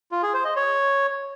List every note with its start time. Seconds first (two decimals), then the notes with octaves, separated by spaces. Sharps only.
0.12 F4
0.23 G#4
0.34 C5
0.45 D#5
0.56 C#5